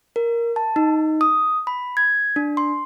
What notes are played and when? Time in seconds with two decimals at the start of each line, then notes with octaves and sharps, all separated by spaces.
0.16 A#4
0.56 A5
0.76 D#4
1.21 D#6
1.67 B5
1.97 G#6
2.36 D4
2.57 C6